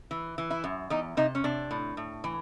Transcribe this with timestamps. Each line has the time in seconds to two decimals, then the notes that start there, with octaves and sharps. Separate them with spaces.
0.11 E3
0.38 E3
0.50 E4
0.64 F#2
0.90 E2 D#4
1.17 C3 D#4
1.35 C#4
1.44 C3 D4
1.71 A2
1.97 A2
2.24 E3